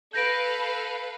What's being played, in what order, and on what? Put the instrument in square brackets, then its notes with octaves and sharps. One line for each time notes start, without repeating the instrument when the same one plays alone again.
[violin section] A4 B4 F5 [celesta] G6 A#6 D7